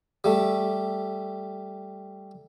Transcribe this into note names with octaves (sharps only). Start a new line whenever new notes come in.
G3 A3